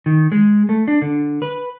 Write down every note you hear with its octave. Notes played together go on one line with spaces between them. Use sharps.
D#3
G#3
A3
D4
D3
B4